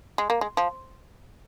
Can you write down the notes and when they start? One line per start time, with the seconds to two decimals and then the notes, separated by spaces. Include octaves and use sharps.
0.18 G#3
0.30 A#3
0.41 G#3
0.57 F3